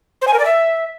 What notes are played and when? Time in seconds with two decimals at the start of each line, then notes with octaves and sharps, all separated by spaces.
0.21 C5
0.27 G#5
0.33 A#4
0.39 D5
0.45 E5